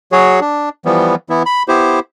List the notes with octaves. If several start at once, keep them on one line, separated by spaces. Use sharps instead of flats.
F#3 F#4 G#4 C#5
D4
E3 F3 G3 B3
E3 B3 E4
B5
B3 E4 G4 C5